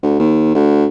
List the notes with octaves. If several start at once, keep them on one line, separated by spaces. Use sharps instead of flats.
D2
D#2
D2